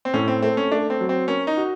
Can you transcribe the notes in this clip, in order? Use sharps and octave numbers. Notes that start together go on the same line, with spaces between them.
C4
A2 C#4
C4
A3 C4
C#4
A3 D4
C4
F#3
C4
C#4 A#4
D#4
F#4